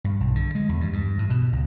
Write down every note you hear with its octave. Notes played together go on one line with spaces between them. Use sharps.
G2
B1
D3
G#3
E2
G2
G2
A2
B2
C#2